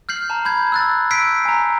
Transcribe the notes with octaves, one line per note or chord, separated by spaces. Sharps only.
F6 G6 C7 F#7
A5 A#5
B5 G6 G#6
E6 F#6 A6
E6 G6 B6 C7 D7
G#5 A#5